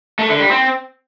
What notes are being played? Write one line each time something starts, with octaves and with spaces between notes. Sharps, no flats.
A3
D3
G3
C4